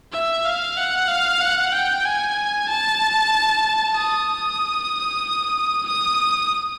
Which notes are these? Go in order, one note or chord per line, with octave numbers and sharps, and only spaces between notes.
E5
F5
F#5
F5
F#5
G5
G#5
A5
D#6
D#6